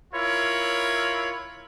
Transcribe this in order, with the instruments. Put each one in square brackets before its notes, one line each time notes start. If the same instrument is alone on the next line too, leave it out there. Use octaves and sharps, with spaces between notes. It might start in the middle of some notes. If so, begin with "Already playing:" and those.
[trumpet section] E4 F4 A#4 C#5 B5